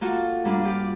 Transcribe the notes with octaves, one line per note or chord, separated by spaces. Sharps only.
A#3 F4 F#4 A4
G2 A#3 D4 F4
F4 G4 D5